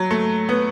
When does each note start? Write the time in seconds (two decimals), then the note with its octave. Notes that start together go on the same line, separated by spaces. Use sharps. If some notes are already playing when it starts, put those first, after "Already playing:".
Already playing: F#3
0.11 A3
0.49 B3